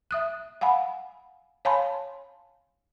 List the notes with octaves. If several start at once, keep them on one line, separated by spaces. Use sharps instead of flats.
E5 D#6 F#6
F5 F#5 G#5 B5
C#5 F5 G#5 A5 B5 C6